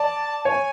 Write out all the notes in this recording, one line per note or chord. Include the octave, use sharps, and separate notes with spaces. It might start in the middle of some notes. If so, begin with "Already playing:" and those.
Already playing: D5 A5
C#5 G#5